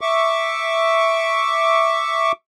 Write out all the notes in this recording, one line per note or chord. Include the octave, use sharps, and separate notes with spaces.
E5 C#6 D6